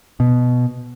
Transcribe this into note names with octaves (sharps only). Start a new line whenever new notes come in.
B2